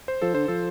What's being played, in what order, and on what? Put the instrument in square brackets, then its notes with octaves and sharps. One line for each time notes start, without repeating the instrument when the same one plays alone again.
[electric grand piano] C5
[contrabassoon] F3 [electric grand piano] A4
[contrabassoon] D3 [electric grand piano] C5
[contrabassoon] F3 [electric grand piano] A4